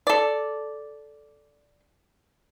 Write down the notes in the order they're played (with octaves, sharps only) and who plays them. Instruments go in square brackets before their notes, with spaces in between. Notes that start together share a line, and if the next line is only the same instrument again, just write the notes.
[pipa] A4 D5